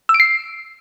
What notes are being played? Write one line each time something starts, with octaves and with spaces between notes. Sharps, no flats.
E6
D7
C7